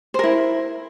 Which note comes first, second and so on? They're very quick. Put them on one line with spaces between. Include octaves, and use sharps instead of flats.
C5 A#4 E4